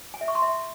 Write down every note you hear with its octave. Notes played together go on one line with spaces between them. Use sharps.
G#5
E5
C#6
C6
E5